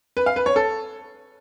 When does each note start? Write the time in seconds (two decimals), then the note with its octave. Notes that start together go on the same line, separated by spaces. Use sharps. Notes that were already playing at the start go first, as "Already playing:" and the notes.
0.17 B4
0.26 F5
0.36 B4
0.46 C#5
0.56 A4